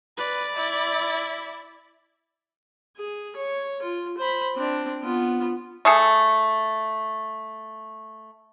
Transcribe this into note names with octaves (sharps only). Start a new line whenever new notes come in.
B4 D5
E4
G#4
C#5
F4
C5 B5
C4 D4
B3 F4
A3 G#4 A4